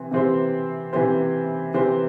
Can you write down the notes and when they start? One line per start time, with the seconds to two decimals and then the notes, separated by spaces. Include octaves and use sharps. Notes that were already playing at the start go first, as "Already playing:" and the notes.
Already playing: C3 E3 C4
0.11 C3 E3 C4 G4 C5
0.93 C3 E3 C4 G4 C5
1.74 C3 E3 C4 G4 C5